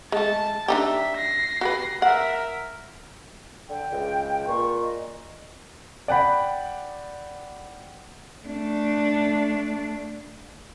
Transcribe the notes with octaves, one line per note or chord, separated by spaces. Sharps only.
G#3 A3 A5
D4 D#4 G4 E5
A#6 C7
F#4 G4 B4
A#4 E5 F#5
D3 G5
C#2
A#2 C#6
D#5
D5 F#5 G5 B5
A3 D4